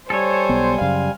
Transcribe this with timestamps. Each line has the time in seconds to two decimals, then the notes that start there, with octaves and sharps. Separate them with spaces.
0.10 G3 A4 C5 C#5 G#5
0.49 B1 B3
0.81 F#2 C#3 F5